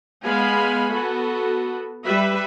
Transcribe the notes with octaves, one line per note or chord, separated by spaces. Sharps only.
G#3 B3 F5 G#5 B5
B3 F#4 A4
G3 B4 E5